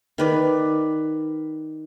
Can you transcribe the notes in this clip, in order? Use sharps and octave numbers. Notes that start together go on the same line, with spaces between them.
D#3 B4 D5